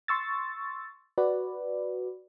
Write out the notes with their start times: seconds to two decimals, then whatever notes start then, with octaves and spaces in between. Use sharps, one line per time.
0.08 C6 C#6 E6 A6
1.18 F#4 B4 D5